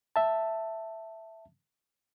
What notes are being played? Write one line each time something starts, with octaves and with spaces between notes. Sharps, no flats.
E5 A5